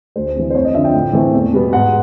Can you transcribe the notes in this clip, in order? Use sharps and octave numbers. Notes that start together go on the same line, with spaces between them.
D2 C5
C3 E3
C5
F2 C#5
D#5
D3 F3 E5
G5
A2
E3 A3 C4
E2
B2 G3 B3
G#2 F#5